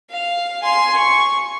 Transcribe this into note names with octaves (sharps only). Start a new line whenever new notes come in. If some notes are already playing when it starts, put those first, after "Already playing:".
F5
G#5 C6
C#6